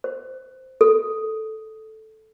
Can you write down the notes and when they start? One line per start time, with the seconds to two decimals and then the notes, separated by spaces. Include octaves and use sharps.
0.04 C5
0.81 A4